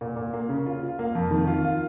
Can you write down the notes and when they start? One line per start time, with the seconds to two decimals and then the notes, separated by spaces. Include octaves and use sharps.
0.01 A#2
0.16 A#2
0.33 A#3
0.49 C#3
0.66 F4
0.82 F4
0.99 A#3
1.15 F2
1.31 D#3
1.47 F4
1.65 F4